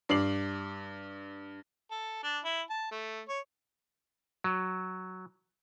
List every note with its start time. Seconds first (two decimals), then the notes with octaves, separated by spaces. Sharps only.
0.09 G2 D6 C7 F#7
1.91 A4
2.23 D4
2.45 E4
2.70 A5
2.91 A3
3.28 C#5
4.44 F#3